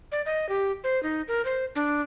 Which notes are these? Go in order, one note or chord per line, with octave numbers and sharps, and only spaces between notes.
D5
D#5
G4
C5
D#4
A#4
C5
D4